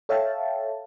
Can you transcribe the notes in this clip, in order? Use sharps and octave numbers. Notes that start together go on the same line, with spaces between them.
A4 C#5 E5 F5 G5 A5